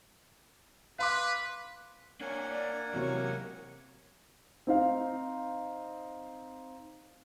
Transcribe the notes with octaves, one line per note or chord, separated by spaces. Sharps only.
B4 F5 C6 D6
A#3 D4 C#5 F#5 G#5
D5
C#2 C3 E3 F#3 A#4 C#5
C4 D#4 F5